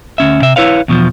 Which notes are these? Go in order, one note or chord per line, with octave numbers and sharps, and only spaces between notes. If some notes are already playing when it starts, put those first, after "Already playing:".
D2 C#4 E5
C3 E5
E4 B4 C#5 F5
E2 B2 E3 F3